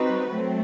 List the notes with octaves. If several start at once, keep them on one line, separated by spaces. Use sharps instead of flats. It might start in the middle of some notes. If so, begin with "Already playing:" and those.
Already playing: G3 C4 D#4 F#4 B4
F#3 A3 C4